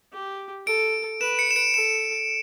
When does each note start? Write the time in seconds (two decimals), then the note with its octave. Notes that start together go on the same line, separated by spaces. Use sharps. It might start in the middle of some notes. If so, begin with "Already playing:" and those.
0.13 G4
0.67 A4 D7
1.21 B4 E7
1.39 C#7
1.51 E7
1.56 D7
1.74 A4 E7